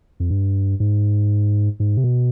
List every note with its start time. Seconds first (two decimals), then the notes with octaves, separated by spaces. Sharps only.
0.20 F2
0.30 G2
0.80 G#2
1.80 G#2
1.97 C3
2.04 B2